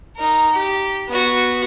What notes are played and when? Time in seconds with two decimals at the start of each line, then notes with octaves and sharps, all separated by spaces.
0.16 D#4 A#4
0.52 G4
1.08 B3 F#4